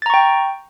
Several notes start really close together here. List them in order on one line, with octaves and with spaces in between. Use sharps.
A6 A#5 C#6 G5